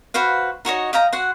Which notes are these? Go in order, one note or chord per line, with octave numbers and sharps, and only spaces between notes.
F#4 B4 C5 F5
D#4 F#4 C#5 D#5
D#5 F5 G5 A#5
F#4 F#5 C6